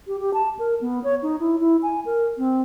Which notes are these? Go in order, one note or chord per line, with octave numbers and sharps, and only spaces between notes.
G4
G4
A5
A#4
B3
C#5
D#4
E4
E4
G#5
A#4
C4